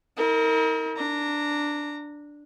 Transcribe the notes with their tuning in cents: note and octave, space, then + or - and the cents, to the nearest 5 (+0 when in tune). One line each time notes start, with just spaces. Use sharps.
D#4 +45 A#4 -25
D4 +0 A#5 -20